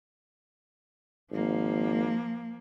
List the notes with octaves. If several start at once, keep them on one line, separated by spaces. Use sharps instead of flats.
G#1 F3 A#3